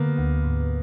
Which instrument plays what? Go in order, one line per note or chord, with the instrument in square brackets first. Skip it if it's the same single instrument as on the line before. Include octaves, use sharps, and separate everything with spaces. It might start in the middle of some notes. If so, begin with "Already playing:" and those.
Already playing: [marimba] D3 [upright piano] A#3 B3
[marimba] D2
G#2